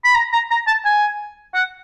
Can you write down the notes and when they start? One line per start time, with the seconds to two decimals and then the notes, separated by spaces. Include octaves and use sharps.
0.04 B5
0.15 A#5
0.33 A#5
0.51 A#5
0.67 A5
0.85 G#5
1.54 F#5